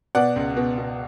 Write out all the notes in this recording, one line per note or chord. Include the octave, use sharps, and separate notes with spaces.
B2 D5 F#5
C#2
B2
B2